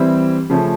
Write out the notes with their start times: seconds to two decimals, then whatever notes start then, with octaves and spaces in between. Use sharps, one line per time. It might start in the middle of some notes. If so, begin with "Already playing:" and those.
Already playing: E3 G3 C4 E4
0.50 C#3 F3 A3 C#4